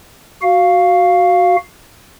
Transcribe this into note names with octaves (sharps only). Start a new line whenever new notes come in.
F#4 F5